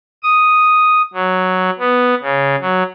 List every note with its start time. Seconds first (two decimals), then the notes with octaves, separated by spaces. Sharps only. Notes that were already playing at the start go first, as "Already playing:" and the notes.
0.23 D#6
1.14 F#3
1.79 B3
2.22 C#3
2.61 F#3